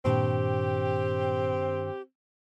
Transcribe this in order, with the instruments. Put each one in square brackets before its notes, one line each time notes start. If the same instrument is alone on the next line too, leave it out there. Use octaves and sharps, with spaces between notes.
[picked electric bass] G2 D#3 D4 [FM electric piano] A#2 [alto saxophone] C4 [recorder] G4